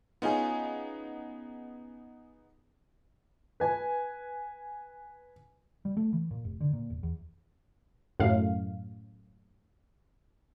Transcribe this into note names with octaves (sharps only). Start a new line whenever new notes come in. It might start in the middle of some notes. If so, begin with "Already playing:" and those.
B3 C#4 D#4 F4 G#4
B4 G#5
G3
A3
E3
A#2
F1
D3
A#2
E1
E2
F#2 A2 F5